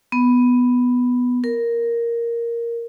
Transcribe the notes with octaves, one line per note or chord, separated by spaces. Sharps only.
B3
A#4